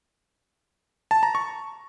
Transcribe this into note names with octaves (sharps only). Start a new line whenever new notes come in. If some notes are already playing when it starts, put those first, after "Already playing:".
A5
A#5
C#6